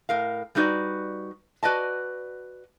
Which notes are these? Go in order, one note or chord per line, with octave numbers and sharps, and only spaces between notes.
A2 A#4 F5
G3 A3 D#4 F#4 B4 D5
F#4 B4 D5 D#5 A5